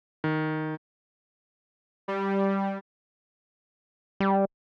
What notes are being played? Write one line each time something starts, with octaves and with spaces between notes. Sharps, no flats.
D#3
G3
G3